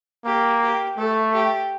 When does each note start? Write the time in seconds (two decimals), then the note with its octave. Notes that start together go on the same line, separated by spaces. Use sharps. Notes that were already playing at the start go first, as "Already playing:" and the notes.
0.25 A#3 G4
0.62 G4
0.97 A3 A4
1.33 G4